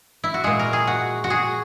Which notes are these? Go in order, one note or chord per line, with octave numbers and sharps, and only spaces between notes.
E4
F#4
A#2 G#3 G#4
A#4
G#4
F#4
F#4
G#4